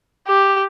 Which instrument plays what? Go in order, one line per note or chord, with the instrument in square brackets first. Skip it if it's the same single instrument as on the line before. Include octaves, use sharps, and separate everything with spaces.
[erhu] G4